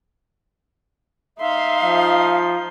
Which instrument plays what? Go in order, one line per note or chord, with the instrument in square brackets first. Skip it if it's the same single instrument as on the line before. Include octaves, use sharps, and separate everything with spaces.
[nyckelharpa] D#4 C6 [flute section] E5 F5
[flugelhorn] F3